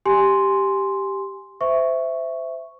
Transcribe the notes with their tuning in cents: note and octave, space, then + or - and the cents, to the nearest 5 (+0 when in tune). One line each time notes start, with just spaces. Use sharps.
G4 -5 G#5 +0 C6 +0
C5 -25 E5 +0 C#6 +0